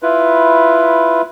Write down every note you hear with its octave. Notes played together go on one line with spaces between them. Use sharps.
E4 F4 B4